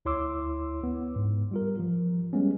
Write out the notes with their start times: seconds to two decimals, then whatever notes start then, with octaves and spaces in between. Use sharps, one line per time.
0.05 D2 E4 C#5 C6 D6 E6
0.83 B3
1.16 G#2
1.51 G3 F4 A#4
1.79 F3
2.33 G3 G#3 B3 C#4